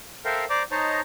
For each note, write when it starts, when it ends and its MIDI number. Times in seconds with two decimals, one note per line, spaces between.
0.25 0.45 69
0.25 0.45 70
0.25 0.45 72
0.25 0.45 76
0.25 0.45 77
0.25 0.45 79
0.50 0.63 72
0.50 0.63 74
0.50 0.63 82
0.50 0.63 86
0.71 1.01 63
0.71 1.01 72
0.71 1.01 73
0.71 1.01 75
0.71 1.01 81
0.71 1.01 82